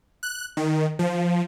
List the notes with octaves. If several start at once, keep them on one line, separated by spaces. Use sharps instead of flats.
F#6
D#3
F3